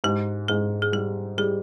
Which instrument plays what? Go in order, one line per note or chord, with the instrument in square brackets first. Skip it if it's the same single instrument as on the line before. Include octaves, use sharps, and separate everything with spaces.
[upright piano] G#2 [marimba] G4
[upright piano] G#2 [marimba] G#4
[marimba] G#4
[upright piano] G3 [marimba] G4
[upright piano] G3 [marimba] G#4